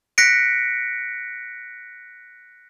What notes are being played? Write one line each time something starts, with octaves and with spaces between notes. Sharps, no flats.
F#6 A#6 B6 C#7 D7